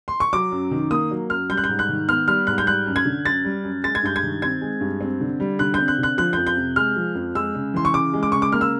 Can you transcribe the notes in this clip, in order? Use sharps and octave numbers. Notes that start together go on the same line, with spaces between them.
C6
C#6
F#3 D6
F#2
D#3
A#3 D#6
F#3
F#2 F6
G3 G6
F#6
G6
G#2
F#6
D#3
B3 F6
G3 F6
G#2 F#6
G6
G3 F#6
F#2
G#6
D3
F#2 A6
G3
F#2
G#3 A6
G#6
G2 G6
G#6
D#3
C4 G#6
G#3
G2
C4
D3
G3
D3 F#6
C4 G6
F#6
D3 F#6
F3 F#6
F2 G6
G6
C3
G#3 F6
F3
F2
G#3 E6
C#3
E3 C6
C#6
C#3 D6
G#3
D6
C#3 C#6
D6
A#3 F6
E6